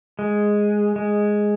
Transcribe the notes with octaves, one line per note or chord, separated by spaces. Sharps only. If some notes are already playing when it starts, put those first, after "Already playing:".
G#3
G#3